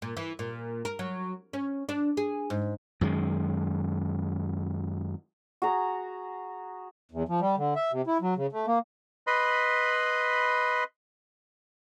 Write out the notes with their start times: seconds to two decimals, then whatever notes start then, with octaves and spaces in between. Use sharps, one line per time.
0.02 A#2
0.17 E3
0.39 A#2
0.85 A#4
0.99 F#3
1.53 C#4
1.89 D4
2.17 G#4
2.50 G#2
3.01 F#2 D#3 G#3
5.62 F#4 G#4 A#5
7.12 E2
7.29 F3
7.41 G3
7.57 D3
7.76 E5
7.92 C3
8.07 E4
8.21 F#3
8.37 C#3
8.52 A3
8.67 A#3
9.27 B4 D#5 B5 C6